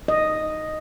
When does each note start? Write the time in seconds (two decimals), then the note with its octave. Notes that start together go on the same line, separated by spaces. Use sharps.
0.08 D#5